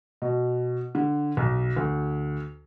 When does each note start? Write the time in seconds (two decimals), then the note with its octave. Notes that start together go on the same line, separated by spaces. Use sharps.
0.22 B2
0.95 D3
1.37 B1
1.77 D2